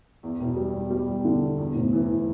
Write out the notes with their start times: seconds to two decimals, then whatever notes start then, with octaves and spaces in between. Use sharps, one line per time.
0.23 E2
0.40 E1
0.56 G3
0.74 E1
0.90 G3
1.08 E2
1.25 D3
1.41 E2
1.58 E2
1.75 F1
1.92 E3